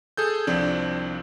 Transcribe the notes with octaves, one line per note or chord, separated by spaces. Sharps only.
G#4 A4 G6
C2 F3 C4 D4